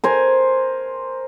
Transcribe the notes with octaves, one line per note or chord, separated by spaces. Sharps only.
A#4 C5 G#5